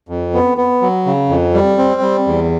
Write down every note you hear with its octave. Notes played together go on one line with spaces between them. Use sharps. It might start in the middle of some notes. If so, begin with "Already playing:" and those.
F2
B3
B3
F#3
C#3
F2
G3
C4
G3
E2